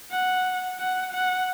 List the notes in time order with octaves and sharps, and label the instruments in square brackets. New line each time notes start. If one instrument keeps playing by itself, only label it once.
[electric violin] F#5
F#5
F#5